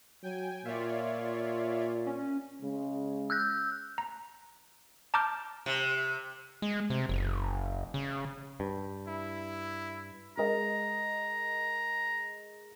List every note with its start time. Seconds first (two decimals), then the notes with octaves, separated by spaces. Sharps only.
0.23 F#3 G5 G#5
0.65 A#2 F4 C#5 D5 E5
2.06 C#4
2.61 C#3 G#3
3.30 E6 F#6 G6
3.98 A#5
5.14 A5 A#5 D6 F6 G6
5.66 C3
6.62 G#3
6.90 C3
7.09 F#1
7.94 C#3
8.60 G2
9.08 E4
10.37 G#3 A#4 D#5 A#5